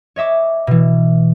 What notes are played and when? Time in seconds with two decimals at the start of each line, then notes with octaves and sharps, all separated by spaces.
0.16 C#5 D#5 E5 D6
0.67 B2 E3